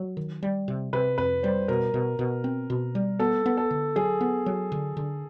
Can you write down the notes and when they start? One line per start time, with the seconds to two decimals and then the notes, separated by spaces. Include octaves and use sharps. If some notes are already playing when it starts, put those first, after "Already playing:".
Already playing: F#3
0.17 D#3
0.43 G3
0.68 C3
0.93 C3 B4
1.18 F2 B4
1.43 G3 C5
1.68 B2 A#4
1.94 B2
2.19 B2
2.44 C4
2.70 B2
2.95 G3
3.19 B3 A4
3.46 B3
3.57 A4
3.71 D3
3.96 F#3 G#4
4.21 B3
4.46 F#3
4.72 D3
4.97 D3